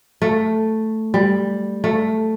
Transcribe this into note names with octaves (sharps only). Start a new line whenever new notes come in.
A3
G3
A3